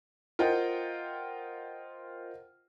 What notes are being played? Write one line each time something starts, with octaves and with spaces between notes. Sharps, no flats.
F4 A#4 C5 D#5 F#5 G5